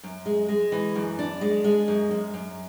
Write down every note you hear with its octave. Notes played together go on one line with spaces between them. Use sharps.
F#2
G#3
G#3
E3
F#2
D4
G#3
G#3
F#2
F#2
F#2